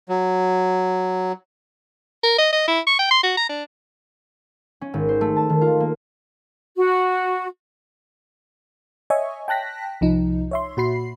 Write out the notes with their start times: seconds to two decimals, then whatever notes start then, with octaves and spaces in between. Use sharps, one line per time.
0.09 F#3
2.23 A#4
2.38 D#5
2.53 D#5
2.68 E4
2.87 C#6
2.99 G5
3.11 C6
3.23 F#4
3.37 A#5
3.49 D4
4.81 C#4
4.94 G#1
5.09 C5
5.21 A3
5.36 A5
5.49 D#3
5.61 F4
5.80 A#3
6.76 F#4
9.10 C#5 D#5 E5 G#5 C#6
9.48 G5 A5 F#6 A#6 B6
10.01 C2 F3 D#4
10.51 C#5 E5 C6
10.77 A#2 F#4 B5 C7